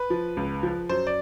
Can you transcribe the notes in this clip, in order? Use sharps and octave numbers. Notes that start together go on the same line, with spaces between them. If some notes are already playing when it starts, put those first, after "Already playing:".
Already playing: B4
F3
C#2
F3
F#2 C5
D5